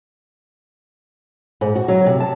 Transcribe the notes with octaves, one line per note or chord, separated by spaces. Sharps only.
G#2
F#4
F#3
C3
A5